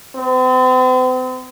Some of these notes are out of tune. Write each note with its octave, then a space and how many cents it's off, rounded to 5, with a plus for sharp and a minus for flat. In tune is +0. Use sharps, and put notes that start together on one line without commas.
C4 -40